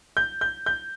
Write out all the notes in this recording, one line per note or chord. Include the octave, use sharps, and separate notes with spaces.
G6
G6
G6